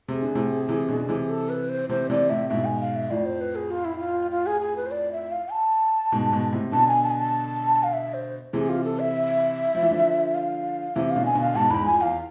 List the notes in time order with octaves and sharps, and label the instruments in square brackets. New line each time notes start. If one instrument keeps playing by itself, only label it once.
[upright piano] C3 [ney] G#4
[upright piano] D3
A2 C3
C3 E3
B2 D3
D3
C3 E3
[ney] A4
B4
C5
[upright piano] C3 E3 [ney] C5
[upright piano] C3 E3 [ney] D5
[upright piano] A2 C3 [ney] E5
[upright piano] G#2 B2 [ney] E5
[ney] G#5
F5
E5
[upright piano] F2 A2 [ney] D5
[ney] C5
B4
G#4
F4
E4
F4
F4
G#4
G#4
B4
C5
D5
E5
F5
A5
[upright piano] G#2 B2
G#2 B2
A2 C3
[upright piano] B2 D3 [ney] A5
[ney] G#5
A5
G#5
A5
F5
E5
C5
[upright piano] C3 E3 [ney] G#4
[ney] F4
A4
E5
[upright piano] F3
E3
D3 F3
[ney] F5
[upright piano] C3 E3 [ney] E5
[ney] F5
[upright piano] B2 D3
[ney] G#5
[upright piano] B2 D3
[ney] F5
[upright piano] G#2 B2 [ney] A5
[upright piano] E2 G#2 [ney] B5
[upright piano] F2 [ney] G#5
[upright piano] E2 [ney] F5